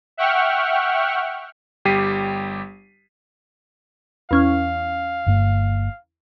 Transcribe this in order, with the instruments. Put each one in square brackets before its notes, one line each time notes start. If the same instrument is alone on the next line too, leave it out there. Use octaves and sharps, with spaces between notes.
[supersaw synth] E5 F#5 G5 C#6 F6
[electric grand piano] G1 G3 G4 B6 C7 D#7
[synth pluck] E2 C#4 F6 [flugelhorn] F5
[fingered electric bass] G1 G2 A#3